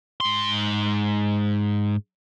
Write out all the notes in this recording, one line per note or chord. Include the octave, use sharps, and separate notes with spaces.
G#2 C6